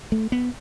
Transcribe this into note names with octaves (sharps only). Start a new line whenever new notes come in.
A3
B3